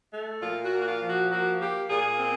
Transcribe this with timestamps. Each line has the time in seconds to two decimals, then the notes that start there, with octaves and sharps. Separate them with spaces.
0.12 A3
0.41 A#2 F4
0.65 F#4
0.72 A#3
0.80 F#4
0.87 F4
1.01 F3
1.09 F#4
1.30 A#3 F#4
1.60 A#3 G4
1.89 A#2 G#4
2.19 C4